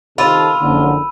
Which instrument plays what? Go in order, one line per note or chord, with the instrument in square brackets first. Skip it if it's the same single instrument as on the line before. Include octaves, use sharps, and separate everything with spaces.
[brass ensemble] C3 D#3 A4 [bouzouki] F4 [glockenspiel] B5 E6 D#7
[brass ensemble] F#1 F2 D3